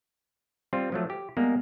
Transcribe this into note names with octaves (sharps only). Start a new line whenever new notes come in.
G3 C4 F4
F3 F#3 A3
G4
G3 G#3 A#3 B3